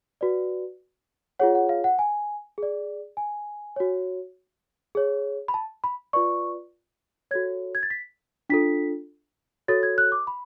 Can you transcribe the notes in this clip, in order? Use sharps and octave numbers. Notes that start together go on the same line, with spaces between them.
F#4 B4 D5
F4 G#4 C#5 F#5
F#5
F5
F#5
G#5
G#4 D5
G#5
F#4 C#5
G#4 C#5
B5
A5
B5
F4 B4 D5 C#6
F#4 A4 C#5 G#6
G#6
A6
B6
D4 F4 A4 B6
F#4 A4 C#5 A6
G#6
F#6
D6
B5